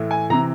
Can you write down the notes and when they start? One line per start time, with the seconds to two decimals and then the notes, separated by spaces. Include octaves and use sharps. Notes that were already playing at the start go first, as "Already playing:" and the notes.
Already playing: A2 E3
0.11 G#5
0.30 C3 E3 A#5